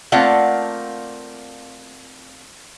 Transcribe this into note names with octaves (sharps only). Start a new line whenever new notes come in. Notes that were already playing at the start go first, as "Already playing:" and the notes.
A3 A#3 C4 F4 D5 F#5